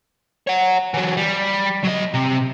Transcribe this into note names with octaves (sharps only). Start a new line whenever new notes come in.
C#5 F#5
E3 F#3
G3
F#3 D#5
C3